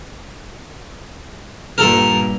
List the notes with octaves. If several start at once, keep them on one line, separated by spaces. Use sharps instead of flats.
G2 A#2 G3 A4 A#4